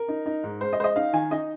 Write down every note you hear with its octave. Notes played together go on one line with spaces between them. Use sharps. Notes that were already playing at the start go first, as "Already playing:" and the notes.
Already playing: A#4
D#4
D#4
G#2
G#3 C5
D#5
G#3 C5
D#5
D#4 F5
D#3 G#5
D#4 D#5